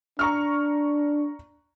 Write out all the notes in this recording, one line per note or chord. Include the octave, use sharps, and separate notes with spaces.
D4 A#5 C#6 F6